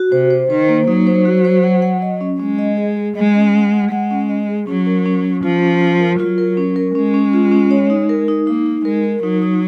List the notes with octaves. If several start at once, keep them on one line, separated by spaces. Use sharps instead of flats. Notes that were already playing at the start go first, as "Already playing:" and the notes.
Already playing: F#4
C3 C5
C5
D#3 C5
A#3
F#3 D#4
C5
F#4
C5
F#5
F#5
D#5
C#4
G#3 C#4
D#5
G#4
G#4
G#3 D#5
C#4
F#5
F#5
G#3 F#5
C#4
D#5
G#4
F#3 C#4
A#4
C#4
C#4
F3 F4
C#4
F4
A#4
F#3 F4
A#4
C#4
A#4
G#3 C#4
C#4
F4
C#4
C#5
D#4
A#4
D#4
A#3 D#4
D#4
G#3 A#4
A#4
F#3 D#4
D#4